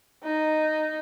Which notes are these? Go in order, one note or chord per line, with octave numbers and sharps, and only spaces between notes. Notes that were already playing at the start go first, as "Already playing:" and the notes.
D#4